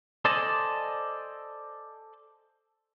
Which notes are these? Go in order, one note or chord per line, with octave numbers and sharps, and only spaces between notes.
A4 C5 D5 D#5 G#5 A5